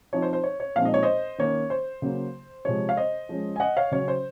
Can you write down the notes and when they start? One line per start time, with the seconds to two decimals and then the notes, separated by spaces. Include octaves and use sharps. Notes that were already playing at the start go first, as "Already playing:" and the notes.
0.13 F3 C4 D#4 C#5
0.22 C5
0.33 C5
0.43 C#5
0.60 C#5
0.76 A#2 F3 G#3 C4 D#4 F5
0.85 D#5
0.94 C#5
1.03 C5 D#5
1.38 D#3 A#3 C#4 C#5
1.70 C5
2.02 C#3 F#3 A#3
2.65 C3 F3 G#3 C#5
2.89 F5
2.97 C5 D#5
3.29 F3 G#3 C#4
3.56 G#5
3.60 D#5 F#5
3.77 C#5 F5
3.92 C#3 F#3 C#4 C#5
4.08 C5